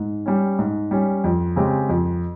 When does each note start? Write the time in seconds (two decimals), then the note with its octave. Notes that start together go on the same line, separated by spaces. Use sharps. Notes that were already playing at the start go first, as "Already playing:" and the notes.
Already playing: G#2
0.26 G3 C#4
0.59 G#2
0.91 G3 C#4
1.24 F2
1.56 C#3 G#3 C4 G4
1.89 F2